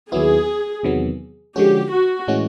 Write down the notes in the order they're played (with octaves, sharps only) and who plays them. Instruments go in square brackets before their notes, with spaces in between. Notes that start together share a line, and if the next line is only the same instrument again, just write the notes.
[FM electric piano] D#2 D#3 F#3 B3 E4 [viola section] G#4
[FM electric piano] E2 C3 D#3 F#3 B3
[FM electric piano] D3 F3 G#3 C#4 F#4 [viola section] G4
[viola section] F#4
[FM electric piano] A2 E3 G#3 C#4 F#4